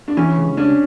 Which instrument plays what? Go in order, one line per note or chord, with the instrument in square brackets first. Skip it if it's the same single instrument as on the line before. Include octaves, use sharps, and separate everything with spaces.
[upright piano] D4
[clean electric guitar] E3 [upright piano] C#4
[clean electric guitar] C#2
[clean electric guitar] C#4 [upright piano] D4